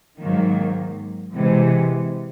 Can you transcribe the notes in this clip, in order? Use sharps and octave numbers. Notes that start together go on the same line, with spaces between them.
G#2 D#3 F#3 A#3
C3 E3 G#3